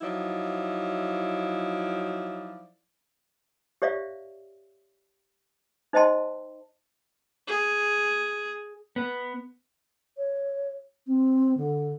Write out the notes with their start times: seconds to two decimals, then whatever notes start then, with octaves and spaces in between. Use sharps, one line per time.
0.02 F3 F#3 D#4 E4 D5
3.82 G4 C#5 D5 E5 F5
5.93 D#4 C5 D#5 G5 A5 C6
7.47 G#4
8.96 B3
10.17 C#5
11.07 C4
11.57 D3